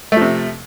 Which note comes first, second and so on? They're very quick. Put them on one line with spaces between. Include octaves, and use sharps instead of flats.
A3 F3 C3